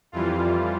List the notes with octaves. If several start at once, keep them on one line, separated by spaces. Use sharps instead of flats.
F2 E3 G3 F4